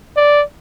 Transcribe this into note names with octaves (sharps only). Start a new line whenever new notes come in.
D5